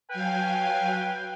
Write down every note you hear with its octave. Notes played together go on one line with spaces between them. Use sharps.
F#3 B4 F5 G5 G#5